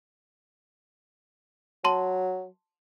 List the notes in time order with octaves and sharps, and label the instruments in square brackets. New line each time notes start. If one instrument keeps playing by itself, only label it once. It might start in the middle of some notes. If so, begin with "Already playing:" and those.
[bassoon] F#3 [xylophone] A5 C6